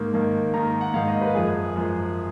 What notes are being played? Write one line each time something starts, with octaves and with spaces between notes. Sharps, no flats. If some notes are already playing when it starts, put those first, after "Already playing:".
Already playing: G#2 D#3 A#3
G#2 D#3 A#3
G#2 D#3 A#3 A#5
A#5
F#5
G#2 D#3 A#3 F5
D#5
B4
F#2 F3 G#3 G#4
F#2 F3 G#3